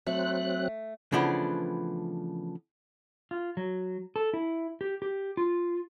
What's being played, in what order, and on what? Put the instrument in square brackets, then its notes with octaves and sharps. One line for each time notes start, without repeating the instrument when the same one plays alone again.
[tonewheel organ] F#3 C4 F#6 [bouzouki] A3
[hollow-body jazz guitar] C#3 E3 F3 A3 B3 D4
[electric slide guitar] F4
F#3
A4
E4
G4
G4
F4